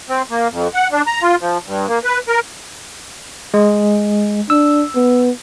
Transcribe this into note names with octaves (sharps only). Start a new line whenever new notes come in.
C4
A#3
F2
F#5
D4
A#5
F4
F3
G2
A#3
B4
A#4
G#3
D4 E6
B3